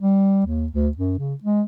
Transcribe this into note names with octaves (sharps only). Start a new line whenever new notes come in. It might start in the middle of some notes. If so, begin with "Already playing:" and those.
G3
D#2
D2
F#2
C#3
G#3